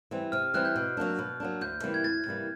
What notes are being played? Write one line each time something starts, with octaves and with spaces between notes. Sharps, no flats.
E3 G3 C4
C3 F6
F6
E3 G3 C4 F#6
G6
B2
F#3 A#3 D4
B2
F#3 A#3 D4
D2 G6
C3 E3 G3 A#3
G#6
D2 A6
C3 E3 G3 A#3